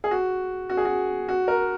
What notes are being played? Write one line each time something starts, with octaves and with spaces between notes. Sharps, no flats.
G#4
F#4
F#4
G#4
F#4
F#4
A#4